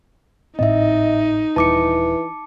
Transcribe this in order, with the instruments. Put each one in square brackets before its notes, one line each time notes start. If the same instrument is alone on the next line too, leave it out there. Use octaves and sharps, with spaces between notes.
[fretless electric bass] G#1 A2 C4 [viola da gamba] D#4 [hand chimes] D#5 E5
[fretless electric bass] D#1 [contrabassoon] E3 [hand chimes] A5 D6 C#7